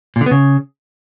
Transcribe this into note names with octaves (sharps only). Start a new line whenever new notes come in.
A#2
D3
B3
C#3